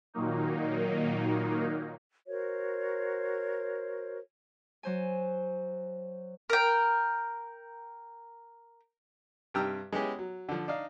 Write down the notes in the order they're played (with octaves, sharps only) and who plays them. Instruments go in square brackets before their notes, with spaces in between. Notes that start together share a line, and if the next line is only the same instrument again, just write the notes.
[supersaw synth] A#2 D#3 F#3 A#3 D#4
[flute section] F#4 A#4 C5 C#5
[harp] F#3 C5 G#5
[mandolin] A#4 G5
[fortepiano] G2 C3 G5 A#5 E6 F6
G#3 B3 C#4 E4 G4 G#4
F#3
D3 F3
D4 D#4 F5